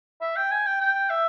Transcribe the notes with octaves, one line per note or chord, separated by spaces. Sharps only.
E5
G5
G#5
G5
G5
E5